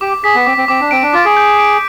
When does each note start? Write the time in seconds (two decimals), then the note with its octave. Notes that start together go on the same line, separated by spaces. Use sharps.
0.01 G4 D6
0.24 G#4 B6
0.35 B3
0.46 C4 D6
0.57 C4
0.68 C4 D6
0.81 D4
0.91 C4 D7
1.03 D4
1.13 F4 D6
1.25 G#4
1.37 G6
1.59 D7